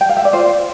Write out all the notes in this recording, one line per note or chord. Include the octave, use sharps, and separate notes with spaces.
G5
F5
E5
D5
F4 C5